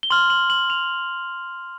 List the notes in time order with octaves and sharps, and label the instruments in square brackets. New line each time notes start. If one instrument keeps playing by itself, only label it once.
[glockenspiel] G7
C6 F6 F#7
F#7
F#7
F7